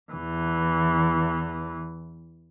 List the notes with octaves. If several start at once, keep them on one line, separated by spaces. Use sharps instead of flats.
E2 E3